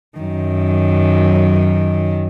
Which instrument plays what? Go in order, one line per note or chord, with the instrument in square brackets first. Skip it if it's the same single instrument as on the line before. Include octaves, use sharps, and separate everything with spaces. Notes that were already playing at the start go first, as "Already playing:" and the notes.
[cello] F#2 D#3